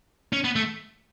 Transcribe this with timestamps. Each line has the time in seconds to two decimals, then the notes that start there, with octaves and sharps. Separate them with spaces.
0.33 C#4
0.44 B3
0.56 A3